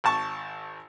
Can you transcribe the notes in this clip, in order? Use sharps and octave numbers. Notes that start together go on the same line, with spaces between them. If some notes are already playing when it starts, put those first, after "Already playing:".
G#1 A5 C#6